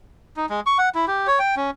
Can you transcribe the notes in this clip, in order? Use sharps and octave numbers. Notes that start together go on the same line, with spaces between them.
D#4
G#3
C#6
F#5
E4
G4
C#5
G5
C#4